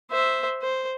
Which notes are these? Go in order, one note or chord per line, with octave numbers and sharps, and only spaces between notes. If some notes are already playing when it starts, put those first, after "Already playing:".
C5 E5
C5